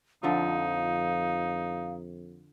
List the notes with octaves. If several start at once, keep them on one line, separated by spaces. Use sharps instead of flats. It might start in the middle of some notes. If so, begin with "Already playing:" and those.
F2 D3 F3 D#4 E5 F5